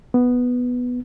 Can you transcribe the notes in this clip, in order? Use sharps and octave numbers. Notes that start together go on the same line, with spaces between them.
B3